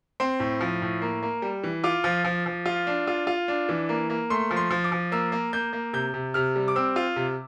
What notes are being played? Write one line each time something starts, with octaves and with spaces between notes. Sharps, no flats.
C4 C6
A2
F3
A2
A#3
A#3
G3
E3
F4 D6
F3
F3
F3
F4
D4
F4
F4
D4
E3
A#3
A#3
A3 C6
F3
C6
F3
D6
F3
A#3 E6
A#3
A#3 G6
A#3
C3 G6
C3
C3 F6
G3
D6
C4 E6
F4
C3